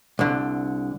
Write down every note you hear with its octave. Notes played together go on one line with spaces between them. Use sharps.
C2 D3